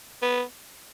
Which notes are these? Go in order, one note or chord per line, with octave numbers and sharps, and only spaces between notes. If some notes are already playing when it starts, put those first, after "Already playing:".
B3